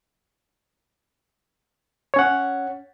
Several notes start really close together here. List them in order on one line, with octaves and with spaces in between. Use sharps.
C#5 C#4 F#5